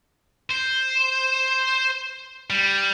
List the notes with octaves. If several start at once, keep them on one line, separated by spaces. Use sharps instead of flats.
C5
G3